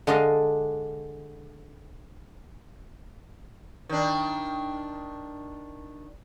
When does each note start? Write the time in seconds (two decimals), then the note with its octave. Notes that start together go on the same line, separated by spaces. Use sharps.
0.07 D3 G#3 D4 D#5 F5
3.89 D#3 D4